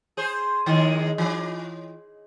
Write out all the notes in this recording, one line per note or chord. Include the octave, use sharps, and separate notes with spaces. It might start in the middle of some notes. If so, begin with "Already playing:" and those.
G#4 C5
D#2 D#3 G#3
E3